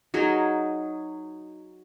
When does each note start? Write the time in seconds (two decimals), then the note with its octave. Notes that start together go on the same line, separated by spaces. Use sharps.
0.14 F#3 D#4 G#4 A#4